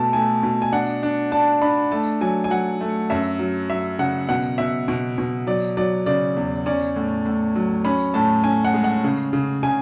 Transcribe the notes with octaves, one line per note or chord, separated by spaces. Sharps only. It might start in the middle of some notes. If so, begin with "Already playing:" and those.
Already playing: B2 A3 A5
A3 G#5
B2
G#5
D4 F#5
D4
D4 A5
D4 B5
A3 A5
F#3 G#5
G#5
F#3 F#5
A3
F#2 E5
F#3
F#3 E5
C#3 F#5
B2 F#5
B2 E5
B2
B2
F#3 D5
F#3 D5
C#3 D5
E2
C#4 D5
A2
A2
F#3
C#4 B5
A2 A5
C#4 G#5
F#5
G#3
F#5
C#3
C#3
C#3 G#5